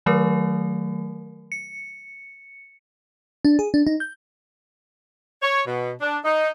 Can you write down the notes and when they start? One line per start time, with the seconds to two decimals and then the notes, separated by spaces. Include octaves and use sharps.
0.06 D#3 F#3 A3 A#4
1.52 C#7
3.45 D4
3.59 G#4
3.74 D4
3.87 D#4
4.00 G6
5.42 C#5
5.67 B2
6.01 D4
6.25 D#4